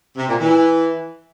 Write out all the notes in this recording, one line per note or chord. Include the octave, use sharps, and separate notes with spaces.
C3
A#2
E3